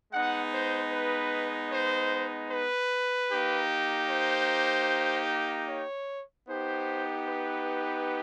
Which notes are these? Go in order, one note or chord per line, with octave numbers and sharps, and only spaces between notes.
G#3 B3 D#4 F#5
C5
B4
C5
B4
A#3 D#4 G4
C5
C#5
B3 D#4 G4 C5
B4